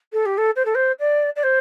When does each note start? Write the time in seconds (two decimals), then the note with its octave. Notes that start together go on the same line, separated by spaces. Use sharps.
0.13 A4
0.26 G4
0.38 A4
0.56 C5
0.65 A4
0.75 C5
0.99 D5
1.36 D5
1.43 C5